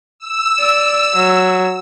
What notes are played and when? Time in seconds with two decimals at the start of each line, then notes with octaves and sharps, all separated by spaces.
0.19 E6
0.60 D5
1.15 F#3